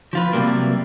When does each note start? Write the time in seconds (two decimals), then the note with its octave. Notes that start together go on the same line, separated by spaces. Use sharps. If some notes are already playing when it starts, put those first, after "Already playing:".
0.13 F3 F4 B4
0.33 C3 E3 F#3 G3 A#3